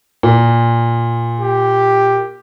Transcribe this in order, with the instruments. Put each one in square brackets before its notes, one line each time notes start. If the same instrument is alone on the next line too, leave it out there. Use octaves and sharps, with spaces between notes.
[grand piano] A#2
[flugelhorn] G4